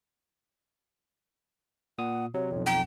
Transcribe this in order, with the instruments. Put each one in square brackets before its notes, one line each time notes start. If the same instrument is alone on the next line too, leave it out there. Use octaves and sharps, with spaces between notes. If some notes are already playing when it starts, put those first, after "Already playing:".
[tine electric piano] A#2 D#6 [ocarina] F#5
[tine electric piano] C3 F#3 [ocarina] C#5
[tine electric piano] B1 F2
[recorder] G5 [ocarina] A#5